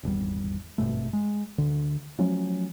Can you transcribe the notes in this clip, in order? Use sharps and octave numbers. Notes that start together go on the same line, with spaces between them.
D#1 G#1 E2 G3
G#1 G2 B2 A3
G#3
D2 D3
F3 F#3 A3 C#4